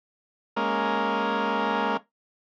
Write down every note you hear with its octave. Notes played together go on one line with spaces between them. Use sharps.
G#3 A#3 C#4 A#4